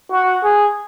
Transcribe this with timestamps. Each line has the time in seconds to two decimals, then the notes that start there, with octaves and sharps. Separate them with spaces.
0.12 F#4
0.44 G#4